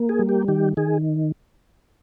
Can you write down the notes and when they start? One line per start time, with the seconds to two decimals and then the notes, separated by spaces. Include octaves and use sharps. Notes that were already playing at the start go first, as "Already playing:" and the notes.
Already playing: A#3
0.09 G#4
0.19 G3
0.29 G4
0.48 D#3 G4
0.77 D#3 G#4